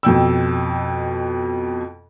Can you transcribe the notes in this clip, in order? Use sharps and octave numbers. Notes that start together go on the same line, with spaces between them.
F2 B2 G5 E6